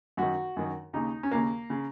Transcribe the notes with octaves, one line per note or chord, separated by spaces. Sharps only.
F#2 D#3 F#4
F#2 D#3
D#2 C#3 D#4
C#4
D#2 C#3 A#3
C#3